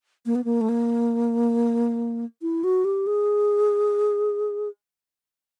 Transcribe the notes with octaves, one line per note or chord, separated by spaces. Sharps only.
A#3
B3
A#3
A3
A#3
E4
F#4
G4
G#4